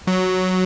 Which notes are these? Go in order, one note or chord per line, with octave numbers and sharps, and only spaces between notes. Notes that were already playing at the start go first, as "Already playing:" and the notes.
F#3